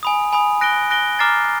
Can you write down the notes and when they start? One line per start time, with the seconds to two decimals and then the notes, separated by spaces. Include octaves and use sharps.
0.03 G#5 B5 D#6
0.33 G#5 B5 D#6
0.61 F#6 A#6 D7 G7
0.90 F#6 A#6 D7 G7
1.19 A#5 D6 F6 A6 C7